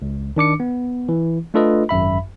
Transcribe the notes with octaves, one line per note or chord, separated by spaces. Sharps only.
C#2
D#3 D4 D6 C#7
B3
E3
A3 D4 F4 A4 B4 D#5
G#1 F#2 E5 B5